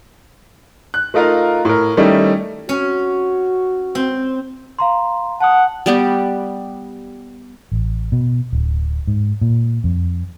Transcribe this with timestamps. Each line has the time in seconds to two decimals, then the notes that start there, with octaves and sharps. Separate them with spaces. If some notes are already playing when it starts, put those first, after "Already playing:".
0.94 F#6
1.14 A3 D#4 F4 A#4 F5
1.65 A2 A#4
1.97 D#3 G3 A3 C#4 D#4 E4
2.69 C#4 F#4
3.95 C4
4.79 F5 A#5 C6
5.41 F#5 A5 D#6
5.86 G3 B3 G4
7.72 A1
8.12 B2
8.53 D1
9.07 G#2
9.41 A#2
9.84 F2